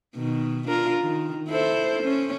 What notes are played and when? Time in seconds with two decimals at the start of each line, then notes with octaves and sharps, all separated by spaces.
0.16 B2 D#3
0.68 D4 F4 A#4
1.02 D#3
1.49 E4 A4 C5
2.03 C#4